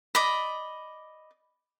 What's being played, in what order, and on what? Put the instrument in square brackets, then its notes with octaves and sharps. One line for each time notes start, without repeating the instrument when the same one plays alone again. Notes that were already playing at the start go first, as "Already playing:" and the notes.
[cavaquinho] D5 D#5 B5